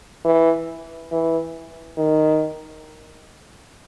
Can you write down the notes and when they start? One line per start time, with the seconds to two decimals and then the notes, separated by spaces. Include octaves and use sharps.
0.25 E3
1.12 E3
1.97 D#3